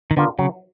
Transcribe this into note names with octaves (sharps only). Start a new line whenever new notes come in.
D#3
D3 B3 D4 F4 A#4
C#3 F#3